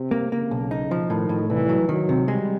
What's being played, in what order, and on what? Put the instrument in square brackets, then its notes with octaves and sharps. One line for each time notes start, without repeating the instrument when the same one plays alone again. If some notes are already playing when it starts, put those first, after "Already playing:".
Already playing: [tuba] C3
[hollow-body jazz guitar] A#3
[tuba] C#3 [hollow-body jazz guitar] A#3
[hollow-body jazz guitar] B1
D#4
F3
[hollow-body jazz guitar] A2 [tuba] D#3
[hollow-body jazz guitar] A2
[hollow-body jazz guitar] C2 [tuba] E3
[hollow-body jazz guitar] F#3
[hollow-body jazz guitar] D#3 [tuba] F#3
[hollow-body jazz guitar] C3
[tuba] G3 [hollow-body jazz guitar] G#3